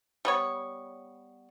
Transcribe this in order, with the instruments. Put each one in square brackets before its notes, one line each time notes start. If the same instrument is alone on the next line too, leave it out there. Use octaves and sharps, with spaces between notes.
[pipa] G3 B3 C#5